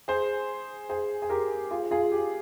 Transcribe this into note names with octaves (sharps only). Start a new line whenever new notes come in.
G#4 C5
G#4 C5
G#4
G4 A#4
F4 G#4
F4 G#4
G4